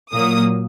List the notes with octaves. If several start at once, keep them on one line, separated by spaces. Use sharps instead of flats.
A#2 F#3 A#3 D#6